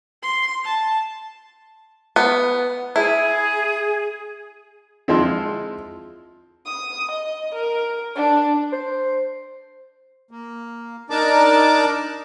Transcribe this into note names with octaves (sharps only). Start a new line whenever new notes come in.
C6
A5
B3
E4 G#4
F3 G#3 C4 E4
D#6
D#5
A#4
D4
C5
A#3
D4 D#4 A#4 D5 A5 D6